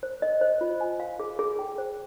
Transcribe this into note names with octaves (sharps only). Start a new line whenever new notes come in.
C5
D#5
C5
F4
G#5
F5
G#4
G#4
G5
C5